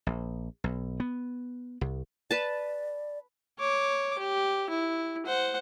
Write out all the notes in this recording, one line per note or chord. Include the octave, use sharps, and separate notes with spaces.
A#1
B1
B3
C2
B4 D5 A5
C#5 D6
G4
E4
C5 F#5